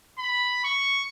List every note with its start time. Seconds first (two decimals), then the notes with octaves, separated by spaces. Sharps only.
0.19 B5
0.64 C#6